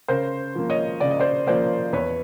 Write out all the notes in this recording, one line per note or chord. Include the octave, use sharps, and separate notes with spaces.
C#3 A#4 C5
F3 A#3
C#5 D#5
C#3 D5
D#5
C5 D5
F3 A#3 C5 D5
E2 B4 C#5